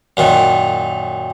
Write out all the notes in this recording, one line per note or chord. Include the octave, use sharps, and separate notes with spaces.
F#2 A#2 D#3